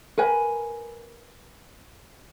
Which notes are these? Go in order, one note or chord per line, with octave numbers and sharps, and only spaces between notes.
A#4 B4 G#5